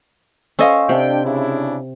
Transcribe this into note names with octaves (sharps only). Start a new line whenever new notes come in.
C#4 A4 C5 D#5 F5
C3 D4 G5
C#3 D4 E4